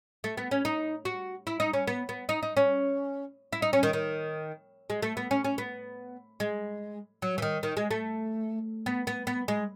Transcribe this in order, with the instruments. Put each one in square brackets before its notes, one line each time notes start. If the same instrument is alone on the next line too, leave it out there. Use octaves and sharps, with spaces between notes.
[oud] A3
B3
C#4
D#4
F#4
E4
D#4
C#4
B3
B3
D#4
D#4
C#4
E4
D#4
C#4
D#3
D#3
G#3
A3
B3
C#4
C#4
B3
G#3
F#3
E3
D#3
D#3
G#3
A3
B3
B3
B3
G#3